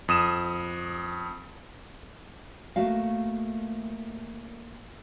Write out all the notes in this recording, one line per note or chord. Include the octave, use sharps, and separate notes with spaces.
F2 D#6 E7
A3 A#3 F#4 F5